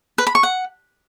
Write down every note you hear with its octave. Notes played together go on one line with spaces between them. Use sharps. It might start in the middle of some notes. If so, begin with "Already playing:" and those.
B4
B5
C#6
F#5